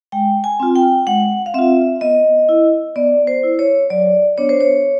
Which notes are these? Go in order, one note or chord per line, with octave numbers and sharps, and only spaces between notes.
G#3 G5
G#5
C4 F4
G5
G#3 F#5
F5
C4 F4 E5
B3 D#5
E4
B3 D5
C5
E4
C#5
F#3 D5
B3 D4 C#5
C5
C#5